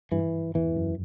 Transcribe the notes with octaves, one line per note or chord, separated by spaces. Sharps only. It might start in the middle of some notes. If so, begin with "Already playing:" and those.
G2 E3
E2 E3
F#2